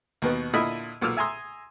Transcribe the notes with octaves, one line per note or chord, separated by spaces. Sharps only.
D#2 B2 B3
A#2 D3 E4 D#5 B5 E6
B1 A#2 D6 E6 F6
E5 G#5 A#5 C6 D#6